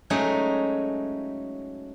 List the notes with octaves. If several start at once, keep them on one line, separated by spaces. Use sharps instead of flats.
F#3 G#3 A3 C#4 D#4 G#4